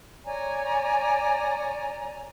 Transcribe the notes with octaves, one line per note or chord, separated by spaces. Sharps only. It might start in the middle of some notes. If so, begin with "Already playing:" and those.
C#5 D5 G#5 A#5